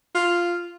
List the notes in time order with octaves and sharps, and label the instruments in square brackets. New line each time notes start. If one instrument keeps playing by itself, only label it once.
[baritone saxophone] F4